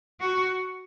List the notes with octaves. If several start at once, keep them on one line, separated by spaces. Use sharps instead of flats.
F#4